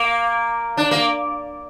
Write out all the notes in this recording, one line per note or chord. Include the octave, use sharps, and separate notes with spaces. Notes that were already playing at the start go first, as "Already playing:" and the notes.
Already playing: A#3
D4
A#3